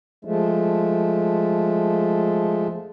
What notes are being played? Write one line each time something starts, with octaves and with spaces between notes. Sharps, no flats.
F3 G#3 A3